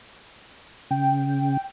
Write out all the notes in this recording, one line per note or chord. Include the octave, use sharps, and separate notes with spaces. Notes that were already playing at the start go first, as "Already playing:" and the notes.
C#3 G5